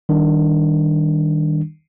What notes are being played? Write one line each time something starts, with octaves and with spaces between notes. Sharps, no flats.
D#3 G3 D4